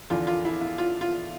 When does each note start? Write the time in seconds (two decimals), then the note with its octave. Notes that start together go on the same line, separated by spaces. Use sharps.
0.10 E2 D3 F3 F4
0.27 F4
0.45 E4
0.61 E4
0.78 F4
1.01 F4